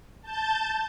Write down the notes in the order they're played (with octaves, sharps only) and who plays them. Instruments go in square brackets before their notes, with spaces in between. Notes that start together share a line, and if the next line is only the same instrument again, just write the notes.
[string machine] A5 G6 A6